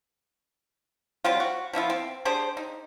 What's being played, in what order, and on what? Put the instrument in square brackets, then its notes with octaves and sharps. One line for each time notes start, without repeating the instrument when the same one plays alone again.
[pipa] F#3 G3 C4 F4
F#4
F3 B3 E4 F4
C4
D4 G4 G#4 C5
D#4